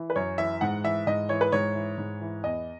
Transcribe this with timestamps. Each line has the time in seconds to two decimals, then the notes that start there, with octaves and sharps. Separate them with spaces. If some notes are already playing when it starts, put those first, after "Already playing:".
Already playing: E3
0.10 B4
0.16 F#2 C#5
0.38 E3 E5
0.61 G#2 F#5
0.84 E3 E5
1.07 G#2 D#5
1.29 E3 C#5
1.41 B4
1.52 G#2 C#5
1.75 E3
1.98 G#2
2.21 E3
2.43 E2 D#5